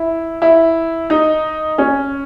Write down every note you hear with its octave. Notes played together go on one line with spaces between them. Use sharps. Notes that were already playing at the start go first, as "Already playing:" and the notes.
Already playing: E4
E4
D#4
C#4